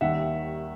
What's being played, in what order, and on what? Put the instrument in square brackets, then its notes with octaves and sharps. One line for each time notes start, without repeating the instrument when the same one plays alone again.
[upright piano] D#2 D#3 G3 E5 F#5